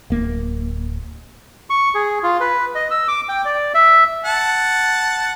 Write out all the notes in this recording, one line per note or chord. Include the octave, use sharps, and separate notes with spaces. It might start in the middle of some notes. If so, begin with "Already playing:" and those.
D1 A#3
C#6
G#4
F4
B4
D#5
E6
D6
G5
D5
E5
F#5 A5